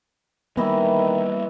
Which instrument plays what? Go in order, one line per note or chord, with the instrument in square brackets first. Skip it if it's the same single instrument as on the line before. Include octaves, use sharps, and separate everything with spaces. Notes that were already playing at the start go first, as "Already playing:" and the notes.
[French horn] D#3 [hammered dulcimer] E3 E4 D#5 [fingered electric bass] G3 A#3 B3 [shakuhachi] E5